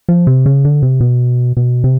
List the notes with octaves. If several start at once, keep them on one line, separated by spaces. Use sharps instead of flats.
F3
C3
C#3
D3
C3
B2
B2
C3